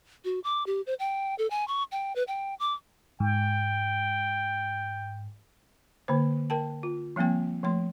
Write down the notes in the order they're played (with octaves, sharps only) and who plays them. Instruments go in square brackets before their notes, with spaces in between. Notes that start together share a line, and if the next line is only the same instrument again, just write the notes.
[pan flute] F#4
D6
G4
C5
G5
A4
G#5
C#6
G5
B4
G5
D6
[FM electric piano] G#2 [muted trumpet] G5
[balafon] D3 A#3 C5
A#4 G5 A5
F4
F3 G3 A#3 C4 G5
F3 A3 C6